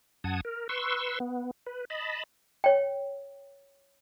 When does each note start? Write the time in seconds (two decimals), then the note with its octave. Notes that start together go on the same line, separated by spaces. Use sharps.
0.24 F#2 F#5 A5 D#6 G#6
0.45 A#4
0.69 B4 C6 C#6 E6
1.20 B3
1.66 B4
1.90 D#5 A5 B5
2.64 C#5 G5